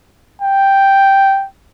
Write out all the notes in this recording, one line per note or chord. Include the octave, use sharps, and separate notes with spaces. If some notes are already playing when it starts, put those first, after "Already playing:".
G5